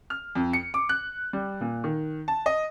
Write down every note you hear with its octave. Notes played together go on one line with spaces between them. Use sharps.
F6
F2
C#7
D6
F#6
G3
A#2
D#3
A5
D#5